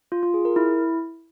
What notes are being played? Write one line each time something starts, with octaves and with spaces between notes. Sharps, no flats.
F4
F4
G#4
A#4
E4